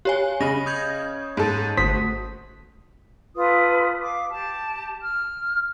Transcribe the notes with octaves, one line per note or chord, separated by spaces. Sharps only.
G4 C#5 G#5
C#3 C#4 D#5 B5 A#6
D#6 G6 G#6
G#2 A4
G1 A3 F#4 C5 D#6 B6
F4 A4 B4 D#6
F5 D6
G4 A5
F6